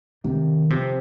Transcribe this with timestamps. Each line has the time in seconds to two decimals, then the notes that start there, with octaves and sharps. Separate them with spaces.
0.24 C3 D#3
0.70 C3 F3 C4